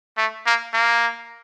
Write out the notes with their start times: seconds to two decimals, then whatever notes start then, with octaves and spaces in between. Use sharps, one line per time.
0.17 A3
0.46 A#3
0.73 A#3